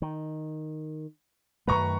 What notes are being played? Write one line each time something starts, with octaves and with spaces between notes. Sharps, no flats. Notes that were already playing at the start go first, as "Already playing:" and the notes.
D#3
F#2 D#3 A3 B4 A#5 C#6